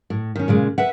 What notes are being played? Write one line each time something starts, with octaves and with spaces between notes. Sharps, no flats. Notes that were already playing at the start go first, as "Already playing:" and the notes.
A2
D#3 C#4
A#2 C#3 G#3
B4 E5 F#5